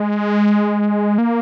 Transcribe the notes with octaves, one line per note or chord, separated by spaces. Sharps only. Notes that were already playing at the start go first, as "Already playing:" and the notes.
Already playing: G#3
A#3